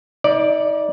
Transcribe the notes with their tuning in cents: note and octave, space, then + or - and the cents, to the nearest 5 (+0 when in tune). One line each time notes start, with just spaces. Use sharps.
D#4 +35 D5 +0